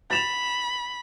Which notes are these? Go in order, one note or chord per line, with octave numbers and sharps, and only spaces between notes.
B5 A6 E7 F7